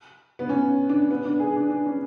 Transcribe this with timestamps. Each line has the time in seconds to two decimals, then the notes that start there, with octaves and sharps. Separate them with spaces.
0.39 B3
0.49 C#4
0.89 D4
1.11 B3
1.25 D4
1.40 G#4
1.56 D4
1.70 D4
1.86 C#4